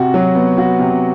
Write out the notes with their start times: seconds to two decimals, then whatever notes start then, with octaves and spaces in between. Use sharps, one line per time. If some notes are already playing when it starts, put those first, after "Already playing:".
Already playing: C3 F#4
0.14 F#3
0.35 B3
0.58 F#4
0.79 C3